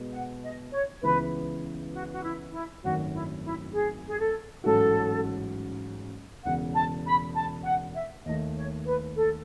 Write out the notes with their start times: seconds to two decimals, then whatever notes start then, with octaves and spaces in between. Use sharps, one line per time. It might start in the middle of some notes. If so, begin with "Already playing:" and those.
Already playing: B2 G#3 B3
0.13 F#5
0.44 D#5
0.73 C#5
1.03 C#2 C#3 E3 B3 B4
1.94 F#4
2.12 F#4
2.23 E4
2.53 E4
2.83 G#1 F#2 D#3 A3 F#4
3.14 E4
3.44 E4
3.73 G#4
4.09 G#4
4.20 A4
4.64 A1 G#2 F#3 C#4 F#4 A4
6.44 E1 E2 C#3 F#5
6.75 A5
7.06 B5
7.35 A5
7.65 F#5
7.95 E5
8.25 D#2 D#3 A3 D#5
8.56 C#5
8.86 B4
9.15 A4